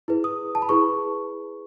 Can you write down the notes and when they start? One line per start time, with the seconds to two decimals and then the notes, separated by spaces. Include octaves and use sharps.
0.08 E4 G#4 B4
0.24 D#6
0.55 A5
0.62 B5
0.69 E4 G#4 B4 C#6